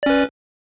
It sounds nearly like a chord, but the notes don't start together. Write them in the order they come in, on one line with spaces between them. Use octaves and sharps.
D5 C#4 B4